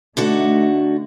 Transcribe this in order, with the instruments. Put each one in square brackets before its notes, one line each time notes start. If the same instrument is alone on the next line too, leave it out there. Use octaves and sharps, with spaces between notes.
[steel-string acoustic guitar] D3 D4 F#4 [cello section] A3 D#4